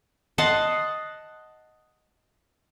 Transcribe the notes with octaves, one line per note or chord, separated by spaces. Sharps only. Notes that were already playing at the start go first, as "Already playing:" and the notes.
D#5 F#5 A5 C6